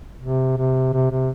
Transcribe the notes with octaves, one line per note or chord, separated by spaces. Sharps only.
C3
C3
C3
C3